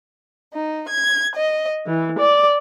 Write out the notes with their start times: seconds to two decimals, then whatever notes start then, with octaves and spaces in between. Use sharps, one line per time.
0.53 D#4
0.88 G#6
1.35 D#5
1.86 E3
2.19 D5